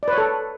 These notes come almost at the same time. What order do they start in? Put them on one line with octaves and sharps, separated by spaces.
D5 B4 C#5 A4